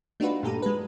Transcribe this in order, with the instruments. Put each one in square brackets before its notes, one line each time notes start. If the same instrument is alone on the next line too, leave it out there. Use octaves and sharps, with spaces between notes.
[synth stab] A3 D4 D#4 F4 F#4 B4
G2 A#2 G4 A4 A#5 D#7
G#3 B4